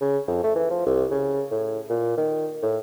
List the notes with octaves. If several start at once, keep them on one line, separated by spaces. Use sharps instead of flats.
C#3
F2
A3
E3
F3
C2
C#3
A2
A#2
D#3
A2